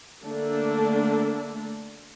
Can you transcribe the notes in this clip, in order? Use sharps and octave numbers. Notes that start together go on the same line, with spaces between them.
D3 A3 A#3 D4 A4